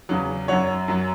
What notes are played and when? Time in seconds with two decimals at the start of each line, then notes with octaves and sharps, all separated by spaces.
0.09 E2 C#3 F#3
0.48 F#2 F#3 C#5 F#5
0.88 F#2 F#3